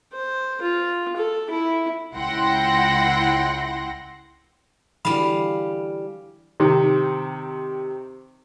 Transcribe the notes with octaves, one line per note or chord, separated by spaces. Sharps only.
C5
F4
A4
E4
C#2 E4 F#5 G5 C6 A#6
D3 E3 G3 F#4 F5 B5
C3 D#3